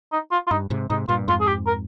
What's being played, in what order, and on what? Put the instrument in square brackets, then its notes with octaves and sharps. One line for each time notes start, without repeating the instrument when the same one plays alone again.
[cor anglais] D#4
F4
F4
[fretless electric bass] G2 [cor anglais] D#4
[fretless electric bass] G#2 C3
[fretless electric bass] G#2 C3 [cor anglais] D#4
[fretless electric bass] G2 A#2 [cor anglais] F4
[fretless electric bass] F2 G#2 [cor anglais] F4
[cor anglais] G#4
G4
A#4